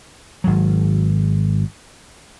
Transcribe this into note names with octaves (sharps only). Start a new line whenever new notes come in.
G#1 F#3